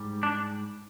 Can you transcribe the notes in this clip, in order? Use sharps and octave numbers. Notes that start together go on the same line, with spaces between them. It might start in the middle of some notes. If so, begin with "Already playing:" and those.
Already playing: G#2 G3
D4